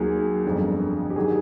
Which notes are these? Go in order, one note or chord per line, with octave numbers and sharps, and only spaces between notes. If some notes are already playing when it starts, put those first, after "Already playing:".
Already playing: D#2 D#3 F#3 G#4
G1 F2 D3
G4
D#3 F#3 G#4